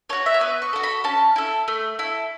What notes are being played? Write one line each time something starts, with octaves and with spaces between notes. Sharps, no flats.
F#4 A4 C#5
E5
C#5
B3 B4
C#6
F#4 A4
B5
C#4 A5
E4 A4
A3
E4 A4